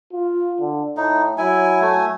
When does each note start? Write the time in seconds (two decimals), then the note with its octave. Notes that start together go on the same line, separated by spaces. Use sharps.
0.13 F4
0.60 D3
0.97 A2 D#4
1.38 F#3 E4 G#5
1.82 A3 G#5